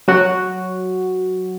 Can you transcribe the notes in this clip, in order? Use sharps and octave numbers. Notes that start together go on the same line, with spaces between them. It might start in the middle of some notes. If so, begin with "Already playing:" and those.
F#3 F#4